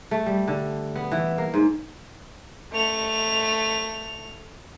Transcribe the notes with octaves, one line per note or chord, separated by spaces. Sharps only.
A3
G3
D3
B3
E3
A#3
G#2
A3 F7